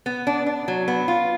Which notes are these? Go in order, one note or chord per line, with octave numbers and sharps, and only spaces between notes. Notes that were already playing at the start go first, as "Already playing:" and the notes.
B3
D4
D4
F#3
B3
F4